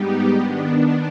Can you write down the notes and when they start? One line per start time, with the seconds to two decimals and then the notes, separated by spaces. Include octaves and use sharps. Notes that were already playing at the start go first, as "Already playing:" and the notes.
Already playing: G#2 G3 B3 D#4 G4
0.33 D#3 B3 D4